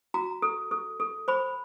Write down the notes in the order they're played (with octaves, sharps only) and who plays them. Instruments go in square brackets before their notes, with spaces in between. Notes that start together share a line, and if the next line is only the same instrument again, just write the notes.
[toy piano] F#4 A#5
A4
A4
A4
C5 B5